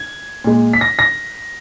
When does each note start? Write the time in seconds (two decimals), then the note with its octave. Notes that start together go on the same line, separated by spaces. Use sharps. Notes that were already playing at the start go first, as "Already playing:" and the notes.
Already playing: G#6
0.44 A#2 G#3
0.73 B6
0.81 A#6
0.99 A#6